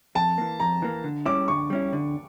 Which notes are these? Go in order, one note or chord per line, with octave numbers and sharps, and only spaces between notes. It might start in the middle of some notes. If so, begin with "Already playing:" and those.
F2 A5
E3 A#3
F2 A#5
E3 A#3
D3
G3 C#4 E4 D6
D3 C#6
G3 C#4 E4
D3